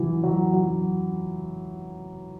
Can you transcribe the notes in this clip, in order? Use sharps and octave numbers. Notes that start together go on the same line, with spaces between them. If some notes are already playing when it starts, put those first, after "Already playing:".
Already playing: E3 F#3
F#3
F#3